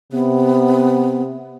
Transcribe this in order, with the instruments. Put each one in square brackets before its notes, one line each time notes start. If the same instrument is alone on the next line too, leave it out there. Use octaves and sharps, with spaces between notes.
[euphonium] C3 [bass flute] B3